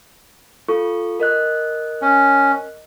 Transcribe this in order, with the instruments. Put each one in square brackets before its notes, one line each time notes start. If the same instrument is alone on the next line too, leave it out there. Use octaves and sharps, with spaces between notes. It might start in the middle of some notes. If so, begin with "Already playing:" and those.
[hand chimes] F4 A4 C#6
A#4 D#5 F#6
[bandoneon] C#4